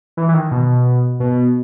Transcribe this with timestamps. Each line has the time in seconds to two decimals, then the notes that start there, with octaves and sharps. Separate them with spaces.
0.17 E3
0.29 E3
0.34 D#3
0.51 B2
1.20 B2